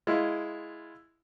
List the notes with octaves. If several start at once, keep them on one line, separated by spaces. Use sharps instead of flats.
G#3 E4 F4